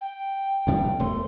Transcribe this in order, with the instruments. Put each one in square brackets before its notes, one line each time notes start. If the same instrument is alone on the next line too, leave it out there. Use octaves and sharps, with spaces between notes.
[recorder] G5
[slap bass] D2 C3 G3
[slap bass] E1 A3 [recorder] C6